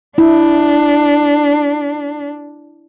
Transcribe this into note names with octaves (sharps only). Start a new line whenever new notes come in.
D4 E4